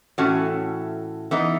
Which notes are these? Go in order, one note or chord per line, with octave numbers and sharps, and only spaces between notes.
A2 E3 A3 C#4 F#4
E3 B3 D#4